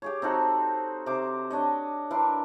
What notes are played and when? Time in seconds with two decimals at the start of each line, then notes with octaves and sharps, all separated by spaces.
0.02 G4 G#4 C#5
0.22 C4 D#4 F#4 A4
1.06 C3 C5 D6
1.50 D4 C#5 D#5
2.10 E3 D4 A#4 C6